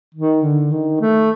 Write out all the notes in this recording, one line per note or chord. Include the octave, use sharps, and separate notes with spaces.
D#3
D3
D#3
A3